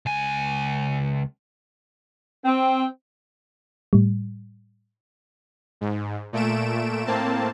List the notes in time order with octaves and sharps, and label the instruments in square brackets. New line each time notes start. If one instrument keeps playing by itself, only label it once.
[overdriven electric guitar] C#2 G#5
[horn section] C4
[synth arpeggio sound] A2 G3
[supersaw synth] G#2
A#2 A3 D7 E7
A2 A#3 C4 A5